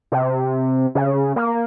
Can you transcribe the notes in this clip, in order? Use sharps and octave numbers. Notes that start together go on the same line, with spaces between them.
C3
C#3
A#3